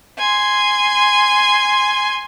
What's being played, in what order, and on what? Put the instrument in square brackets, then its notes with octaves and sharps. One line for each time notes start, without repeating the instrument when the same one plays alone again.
[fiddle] G#5 C6